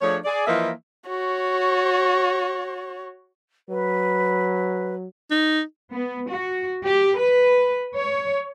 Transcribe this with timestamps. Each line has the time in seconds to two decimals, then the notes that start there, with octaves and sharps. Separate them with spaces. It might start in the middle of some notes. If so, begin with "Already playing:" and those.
0.01 F3 A3 D4 G#4 C#5
0.25 G#4 D5
0.47 E3 F3 A#3 B4 D#5 E5
1.07 F#4 C#5
3.69 F#3 B4
5.31 D#4
5.91 B3
6.28 F#4
6.84 G4
7.17 B4
7.96 C#5